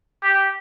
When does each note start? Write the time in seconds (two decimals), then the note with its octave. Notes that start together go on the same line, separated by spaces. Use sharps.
0.23 G4